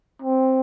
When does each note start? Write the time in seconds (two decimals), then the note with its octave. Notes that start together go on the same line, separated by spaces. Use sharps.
0.22 C4